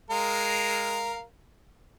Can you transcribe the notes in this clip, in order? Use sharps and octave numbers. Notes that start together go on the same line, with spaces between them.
G#3 A#4 F5